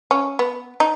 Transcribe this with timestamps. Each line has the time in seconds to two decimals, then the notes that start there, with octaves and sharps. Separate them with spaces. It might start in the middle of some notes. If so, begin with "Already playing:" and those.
0.11 C#4
0.39 B3
0.80 D#4